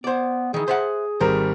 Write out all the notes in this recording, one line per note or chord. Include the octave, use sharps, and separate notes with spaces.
B3 C5 D5
D#3 E3 G#4
C5 E5 F#5
G#1 G3 A#4 C5